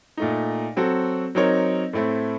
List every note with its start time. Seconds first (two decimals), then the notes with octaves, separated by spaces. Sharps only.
0.17 A#2 A3 D#4
0.76 F#3 C4 F#4 A4
1.35 F#3 C4 D#4 A#4 C#5
1.93 A2 A3 C4